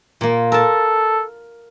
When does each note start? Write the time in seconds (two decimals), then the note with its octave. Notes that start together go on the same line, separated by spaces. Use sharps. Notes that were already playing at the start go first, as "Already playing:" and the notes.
0.21 A#2 A#3
0.52 A4 A#4 A5